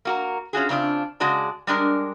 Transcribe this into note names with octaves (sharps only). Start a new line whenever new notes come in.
A#3 F#4 A#4
C#4 F4 F#4 G#4
C#3 C4 D4 F4
C#3 G#3 F#4 D5 A5
G3 G#3 D4 A#4